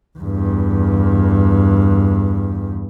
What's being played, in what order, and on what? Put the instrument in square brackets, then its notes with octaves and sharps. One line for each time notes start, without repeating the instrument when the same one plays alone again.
[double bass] E2 G2